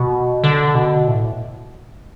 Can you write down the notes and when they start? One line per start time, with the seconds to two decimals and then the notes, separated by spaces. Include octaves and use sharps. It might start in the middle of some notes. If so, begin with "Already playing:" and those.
Already playing: B2
0.44 D3
0.75 B2
1.08 A2